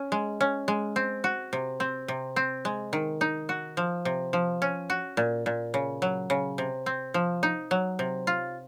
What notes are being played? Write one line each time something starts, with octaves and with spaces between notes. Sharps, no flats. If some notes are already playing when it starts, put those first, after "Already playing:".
Already playing: C#4
G#3
C#4
G#3
C4
F#4
C3
C4
C3
C4
G#3
D#3
D#4
F#4
F3
C3
F3
C#4
F#4
A#2
A#2
C#3
F#3
C#3
C3
C4
F3
D#4
F#3
C3
F4